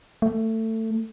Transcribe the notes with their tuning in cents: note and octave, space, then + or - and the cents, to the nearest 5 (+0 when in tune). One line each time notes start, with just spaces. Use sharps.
A3 +20